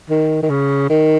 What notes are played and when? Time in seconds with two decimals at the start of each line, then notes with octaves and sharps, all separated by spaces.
0.10 D#3
0.43 D#3
0.50 C#3
0.90 D#3